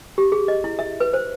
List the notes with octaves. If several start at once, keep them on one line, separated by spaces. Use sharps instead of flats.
G4
G#4
D#5
E4
E5
B4
C5